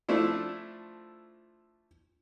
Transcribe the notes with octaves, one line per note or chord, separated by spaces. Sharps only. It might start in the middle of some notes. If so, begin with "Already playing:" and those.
F3 A3 D4 E4